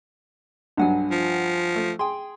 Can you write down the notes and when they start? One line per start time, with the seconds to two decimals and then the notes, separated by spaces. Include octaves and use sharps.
0.77 B1 G2 F#3 D4 F#5 G#5
1.11 F3
1.75 A3
1.99 G#4 G5 C6